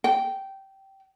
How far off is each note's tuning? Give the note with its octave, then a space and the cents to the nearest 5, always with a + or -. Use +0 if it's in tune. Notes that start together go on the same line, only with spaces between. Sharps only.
G5 -15